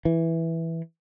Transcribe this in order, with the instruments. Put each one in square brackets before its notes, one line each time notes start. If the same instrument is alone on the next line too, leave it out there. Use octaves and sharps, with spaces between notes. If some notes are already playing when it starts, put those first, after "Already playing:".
[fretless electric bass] E3